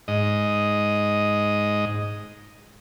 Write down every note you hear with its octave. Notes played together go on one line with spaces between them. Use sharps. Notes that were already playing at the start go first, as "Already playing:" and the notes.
G#2 D#5